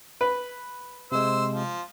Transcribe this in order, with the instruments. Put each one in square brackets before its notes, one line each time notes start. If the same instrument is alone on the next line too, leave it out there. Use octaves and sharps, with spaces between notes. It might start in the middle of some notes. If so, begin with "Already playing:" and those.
[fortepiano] B4
[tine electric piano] C3 G#3 [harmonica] C5 E6
[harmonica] F3